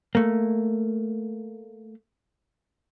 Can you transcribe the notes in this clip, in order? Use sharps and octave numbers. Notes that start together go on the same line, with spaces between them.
A3 A#3